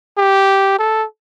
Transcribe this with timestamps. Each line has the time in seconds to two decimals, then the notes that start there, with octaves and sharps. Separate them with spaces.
0.18 G4
0.79 A4